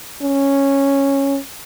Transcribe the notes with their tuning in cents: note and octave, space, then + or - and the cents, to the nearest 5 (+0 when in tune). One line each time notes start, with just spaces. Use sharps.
C#4 -5